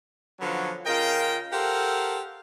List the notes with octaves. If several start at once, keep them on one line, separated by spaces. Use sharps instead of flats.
D3 F3 F#3 B3 C#4
C#3 F4 A#4 D#5 G5
G4 A4 A#4 C5 F5 F#5